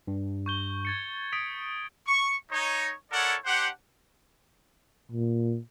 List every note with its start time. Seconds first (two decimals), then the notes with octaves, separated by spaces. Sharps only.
0.07 G2
0.46 C#6 G6 G7
0.85 G#6 A6 C#7
1.33 D#6 B6 D7
2.06 C#6
2.52 D#4 C#5
3.12 E4 A4 A#4 C#5 D5 F#5
3.46 D4 G4 C5 F#5
5.12 A#2